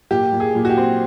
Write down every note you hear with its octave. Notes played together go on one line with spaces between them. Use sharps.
A#2 G4
A#2
G#4
A#2
F#4
G4
C4